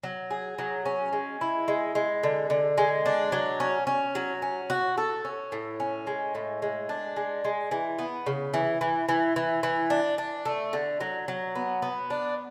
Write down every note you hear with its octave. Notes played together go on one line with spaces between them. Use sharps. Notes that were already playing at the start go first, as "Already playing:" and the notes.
F#3
G#4
F#3
C#4
G#3
E4
G#3
G#3
D3
D3
G#3
D4
F#3
C#4
C#4
F#3
C#4
F#4
A4
C#4
A2
C#4
G#3
A2
G#3
D4
G#3
G#3
E3
B3
C#3
E3
E3
E3
E3
E3
D4
D4
A3
D3
F#3
F#3
B3
B3
D4